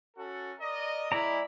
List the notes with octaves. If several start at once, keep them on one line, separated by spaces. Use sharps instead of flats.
C#4 F#4 A4
A#4 D5 D#5
G#3 E4 D5 A#5